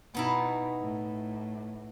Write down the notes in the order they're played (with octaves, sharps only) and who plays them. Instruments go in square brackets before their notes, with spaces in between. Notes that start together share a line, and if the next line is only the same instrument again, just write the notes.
[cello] B2 [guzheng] B3 D#4 E4
[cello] A2